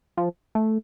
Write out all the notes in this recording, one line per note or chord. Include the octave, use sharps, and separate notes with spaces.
F3
A3